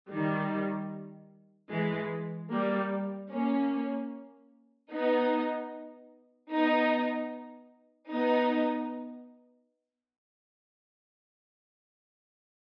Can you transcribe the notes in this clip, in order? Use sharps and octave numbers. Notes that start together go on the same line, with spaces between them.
D#3 G3
E3 G#3
G3 A#3
A#3 C#4
B3 D#4
B3 D#4
B3 D#4